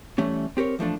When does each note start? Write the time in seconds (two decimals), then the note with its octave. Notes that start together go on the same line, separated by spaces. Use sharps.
0.18 E3 G3 A3 C#4
0.57 C4 G4 A#4 C#5
0.79 E3 F3 A3 D4